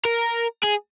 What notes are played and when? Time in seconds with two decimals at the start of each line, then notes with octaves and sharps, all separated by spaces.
0.05 A#4
0.63 G#4